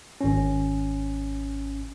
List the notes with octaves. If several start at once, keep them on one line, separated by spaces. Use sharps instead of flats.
G#1 C#4